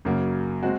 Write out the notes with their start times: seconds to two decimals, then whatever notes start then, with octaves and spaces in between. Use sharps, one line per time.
0.05 F#2 C#3 F#3 A#3
0.63 G#3 C4 F#4